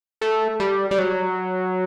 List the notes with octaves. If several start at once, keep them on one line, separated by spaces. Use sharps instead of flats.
A3
G3
G3
F#3